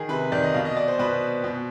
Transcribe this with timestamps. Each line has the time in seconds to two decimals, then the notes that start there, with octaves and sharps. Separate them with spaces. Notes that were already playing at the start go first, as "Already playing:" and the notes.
Already playing: D#3 G#4
0.09 C3 B4
0.32 D#3 D5
0.43 D#5
0.54 B2 F5
0.65 D#5
0.77 D5
0.88 C5
0.99 B2 B4
1.44 B2